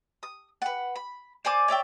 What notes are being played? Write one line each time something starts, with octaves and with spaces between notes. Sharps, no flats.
D#6
B4 F#5
B5
C5 D5 G#5 D6
C#5 D5 E5 G5